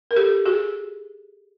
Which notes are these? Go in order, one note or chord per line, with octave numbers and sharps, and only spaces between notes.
A#4
G4 A4
F#4 G#4